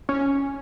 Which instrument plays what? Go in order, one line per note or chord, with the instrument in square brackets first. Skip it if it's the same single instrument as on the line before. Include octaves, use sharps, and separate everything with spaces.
[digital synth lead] C#4